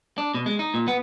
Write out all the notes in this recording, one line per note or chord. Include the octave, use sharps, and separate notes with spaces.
D4
B2
G#3
D#4
A#2
B3